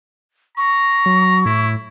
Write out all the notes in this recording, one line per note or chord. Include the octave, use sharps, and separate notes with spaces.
A#5 C#6
F#3
A2 E4